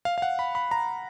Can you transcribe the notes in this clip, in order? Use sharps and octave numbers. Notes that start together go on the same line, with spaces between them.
F5
F5
F#5
B5
B5
A#5